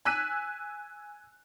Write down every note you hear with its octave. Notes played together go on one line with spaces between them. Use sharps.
G#5 E6 F#6 B6 D#7